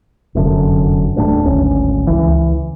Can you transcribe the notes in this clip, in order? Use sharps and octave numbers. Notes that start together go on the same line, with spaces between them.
F1 F#2 D3
D#1 A2 C4 D4
D1 G#1 D2 C#4
C#2 E3